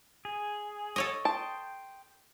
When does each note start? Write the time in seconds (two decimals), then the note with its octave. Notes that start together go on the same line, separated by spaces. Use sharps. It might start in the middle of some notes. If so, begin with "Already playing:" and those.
0.25 G#4
0.96 A4 C#5 D#5
1.25 G5 A5 C6 D#6